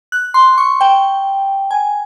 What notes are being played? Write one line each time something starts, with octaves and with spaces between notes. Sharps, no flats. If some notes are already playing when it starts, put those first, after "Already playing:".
F#6
C6
C#6
G5
G#5